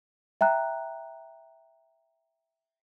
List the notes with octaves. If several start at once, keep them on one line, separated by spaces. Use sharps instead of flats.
E5 G5 A#5 F#6